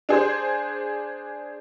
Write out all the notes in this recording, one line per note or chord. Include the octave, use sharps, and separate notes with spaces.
D4 G#4 C5